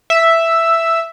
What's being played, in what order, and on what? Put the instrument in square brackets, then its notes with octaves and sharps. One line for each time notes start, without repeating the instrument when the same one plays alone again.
[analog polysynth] E5